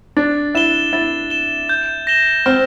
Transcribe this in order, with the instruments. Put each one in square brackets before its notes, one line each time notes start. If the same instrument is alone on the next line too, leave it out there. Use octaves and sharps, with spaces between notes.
[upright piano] D4 [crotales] A6
[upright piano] E4 [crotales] E7 G7
[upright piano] E4 [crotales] A6
[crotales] E7 G7
G6
A#6 E7 G7
[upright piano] C4 [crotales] F6